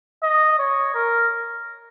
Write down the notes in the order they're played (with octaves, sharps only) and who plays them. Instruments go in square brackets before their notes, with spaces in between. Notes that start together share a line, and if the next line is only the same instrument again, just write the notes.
[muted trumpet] D#5
C#5
A#4